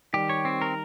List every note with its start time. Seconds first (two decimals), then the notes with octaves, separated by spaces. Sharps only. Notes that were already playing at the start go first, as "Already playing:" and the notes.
0.13 D#3 G3 G4
0.29 C#5
0.45 C4
0.61 A#4